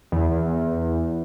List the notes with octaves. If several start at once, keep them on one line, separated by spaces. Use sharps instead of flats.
E2